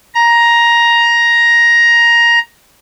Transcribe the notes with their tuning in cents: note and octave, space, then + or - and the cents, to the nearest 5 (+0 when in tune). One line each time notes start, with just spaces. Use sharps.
A#5 +10